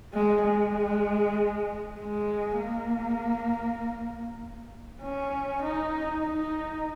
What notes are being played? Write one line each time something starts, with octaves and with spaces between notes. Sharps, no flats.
G#3
G#3
G#3
A#3
C#4
D#4
D#4